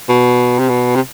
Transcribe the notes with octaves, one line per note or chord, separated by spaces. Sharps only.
B2
C3
B2
C3